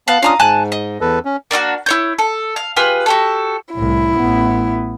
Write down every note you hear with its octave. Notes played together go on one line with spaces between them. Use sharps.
B3 F5 F#5 A5
C#4 D4 F4 F5 A#5 D#6
G#2 G#5 A5 F#6
D#5
E2 A4 B4
C#4
A#3 D4 F4 F#4
E4 C#5 G6
A4
F5
F4 G4 G#4 B4
F#4 G4 A4
C2 A2 E4
A1 B3